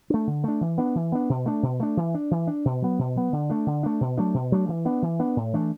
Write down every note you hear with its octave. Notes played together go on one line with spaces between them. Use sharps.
A3 D4
D3
A3 D4
E3
B3 D4
E3
B3 D4
B2
A3 D4
B2
A3 D4
E3
D4
E3
D4
B2
F#3 B3
B2
F#3 B3
D3
A3 D4
D3
A3 D4
B2
F#3 A3 D4
B2
F#3 A3 D4
E3
B3 D4
E3
B3 D4
A2
E3 A3 D4